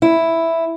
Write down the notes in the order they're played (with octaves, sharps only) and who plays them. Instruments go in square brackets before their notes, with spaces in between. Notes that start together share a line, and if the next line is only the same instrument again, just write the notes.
[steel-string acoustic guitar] E4